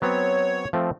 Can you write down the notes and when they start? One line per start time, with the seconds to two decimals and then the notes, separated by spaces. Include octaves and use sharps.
0.02 F#3 B3 C4 C#5
0.73 F3 A3 C4